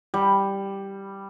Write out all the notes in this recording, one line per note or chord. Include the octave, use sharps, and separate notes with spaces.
G3